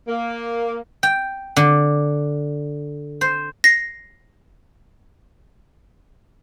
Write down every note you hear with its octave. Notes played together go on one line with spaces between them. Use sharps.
A#3
G5
D3
C5
A#6 C7